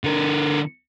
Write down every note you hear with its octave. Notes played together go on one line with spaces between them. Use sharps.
D3 A#4